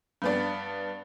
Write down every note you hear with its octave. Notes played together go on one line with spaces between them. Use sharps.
G2 B3 D4